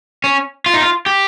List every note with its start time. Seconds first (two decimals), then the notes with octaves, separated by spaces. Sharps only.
0.24 C#4
0.66 F4
0.74 D#4
0.82 F4
1.06 G4